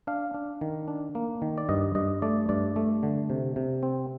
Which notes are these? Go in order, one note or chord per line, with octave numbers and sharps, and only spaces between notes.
D4 F5
D4
D#3
D4
A#3
D#3
D5
G2 D#5
G2 D#5
A3 D5
G2 D5
A3
D3
C3
C3
C4